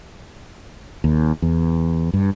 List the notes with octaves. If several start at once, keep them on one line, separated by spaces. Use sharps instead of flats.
D#2
E2
G2